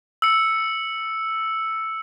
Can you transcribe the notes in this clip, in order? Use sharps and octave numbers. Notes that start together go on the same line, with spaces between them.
E6 C#7